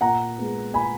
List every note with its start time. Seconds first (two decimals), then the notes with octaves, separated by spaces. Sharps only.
0.01 A#2 F#5 A#5
0.38 G#3 B3
0.74 A#2 G#5 B5